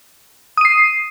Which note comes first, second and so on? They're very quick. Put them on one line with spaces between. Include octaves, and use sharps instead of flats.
D#6 D#7 C7